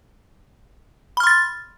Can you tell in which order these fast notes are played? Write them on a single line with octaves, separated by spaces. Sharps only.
B5 F6 C6 A6